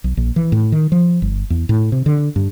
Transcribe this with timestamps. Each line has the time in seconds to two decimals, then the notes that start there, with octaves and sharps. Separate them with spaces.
0.04 B1
0.17 A#1
0.36 E3
0.52 A2
0.72 D#3
0.92 F3
1.22 G1
1.50 E2
1.69 A2
1.92 C3
2.06 D3
2.36 G2